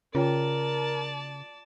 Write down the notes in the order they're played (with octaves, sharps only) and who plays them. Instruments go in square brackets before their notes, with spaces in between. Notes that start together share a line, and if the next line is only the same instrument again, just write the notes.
[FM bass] C#3 [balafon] F4 C#5 G5 [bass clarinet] A#4 [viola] D5 A5